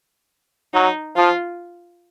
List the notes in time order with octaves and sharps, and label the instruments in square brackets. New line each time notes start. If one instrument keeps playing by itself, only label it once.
[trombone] F#3 [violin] D#4
[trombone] F3 [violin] F4